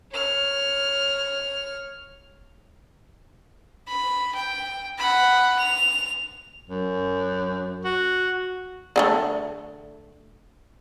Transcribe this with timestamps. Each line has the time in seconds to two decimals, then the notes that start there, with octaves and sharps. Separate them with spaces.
0.12 C#5 F6
3.88 B5
4.35 G5
4.98 F#5 B5
5.59 F7
6.70 F#2
7.85 F#4
8.96 D3 G#3 A3